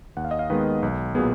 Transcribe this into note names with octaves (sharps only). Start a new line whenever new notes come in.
D#2 F#5
F5
D#5
F5
D#3 G#3 B3 B4
B1
A#2 F#3 B3 G#4